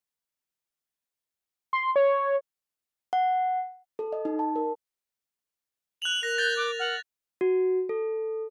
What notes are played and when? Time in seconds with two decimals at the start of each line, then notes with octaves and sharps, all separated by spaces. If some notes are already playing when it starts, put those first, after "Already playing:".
1.73 C6
1.96 C#5
3.13 F#5
3.99 A4
4.13 D#5
4.25 D#4
4.39 A5
4.56 A#4
6.02 F#6 F7 F#7
6.23 A#4 F#6 A#6
6.38 G6 A6
6.57 D6
6.79 F#5 F6
7.41 F#4
7.89 A4